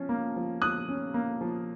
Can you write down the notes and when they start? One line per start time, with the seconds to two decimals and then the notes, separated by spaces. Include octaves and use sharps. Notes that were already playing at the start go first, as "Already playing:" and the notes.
Already playing: F3 C#4
0.09 A#3
0.36 F3
0.61 F3 D#6 F#6
0.88 C#4
1.14 A#3
1.41 F3